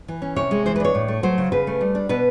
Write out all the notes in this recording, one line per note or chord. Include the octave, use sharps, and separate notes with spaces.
E3
C#4
C3 C#5
G#3
E3 C5
B4
D4 C#5
A2
A3
F#3 C5
C#3
C#3 B4
A3
G3
D4
B2 B4